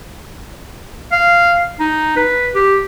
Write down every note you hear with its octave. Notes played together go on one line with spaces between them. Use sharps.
F5
D#4
B4
G4